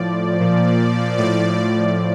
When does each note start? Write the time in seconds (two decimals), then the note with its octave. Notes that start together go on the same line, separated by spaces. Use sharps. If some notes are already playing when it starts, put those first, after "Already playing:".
Already playing: A2 F3 D5
0.39 A#2 F3
1.18 A2 F3 D5
1.57 D5